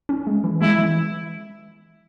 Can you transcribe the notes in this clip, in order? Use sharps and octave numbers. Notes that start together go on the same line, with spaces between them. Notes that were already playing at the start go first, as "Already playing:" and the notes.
C#4
G#3
E3
G#3 E4
E3